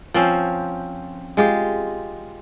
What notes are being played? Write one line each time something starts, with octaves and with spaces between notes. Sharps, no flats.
F3 C4 C#4
G#3 F4 G4